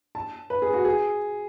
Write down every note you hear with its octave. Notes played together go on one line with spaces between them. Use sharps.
A5
B4
G#4
F#4
G#4